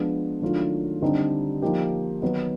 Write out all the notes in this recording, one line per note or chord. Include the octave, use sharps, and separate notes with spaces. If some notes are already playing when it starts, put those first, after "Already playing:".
Already playing: F3 G#3 B3 D4
D#3 F#3 A3 D4 F4
D3 G3 C4 D#4 G4
F3 A#3 D#4 G4
D#3 F#3 B3 D#4